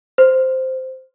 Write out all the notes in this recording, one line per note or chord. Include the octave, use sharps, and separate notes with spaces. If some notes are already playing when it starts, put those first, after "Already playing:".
C5